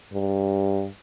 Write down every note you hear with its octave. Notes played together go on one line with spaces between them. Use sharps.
G2